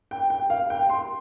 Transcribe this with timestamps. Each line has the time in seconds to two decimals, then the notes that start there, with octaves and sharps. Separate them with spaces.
0.11 G5
0.30 G5
0.50 F5
0.70 G5
0.90 C6